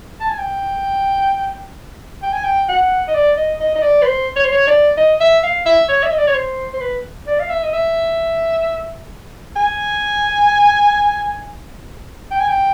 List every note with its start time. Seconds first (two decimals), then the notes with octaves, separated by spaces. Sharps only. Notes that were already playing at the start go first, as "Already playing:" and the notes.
0.20 A5
0.30 G#5
0.38 G5
2.22 G5
2.33 G#5
2.44 G5
2.68 F#5
3.08 D#5
3.15 D5
3.37 D#5
3.60 D#5
3.76 D#5
3.83 D5
4.02 B4
4.06 C5
4.36 C#5
4.45 C5
4.52 C#5
4.67 D5
4.97 D#5
5.20 E5
5.43 F5
5.66 E5
5.89 C#5
6.03 E5
6.11 D#5
6.18 D5
6.27 C#5
6.35 C5
6.73 C5
6.81 B4
7.27 D5
7.40 F5
7.50 E5
7.63 D#5
7.73 E5
9.56 G#5
12.31 G5
12.40 G#5
12.48 G5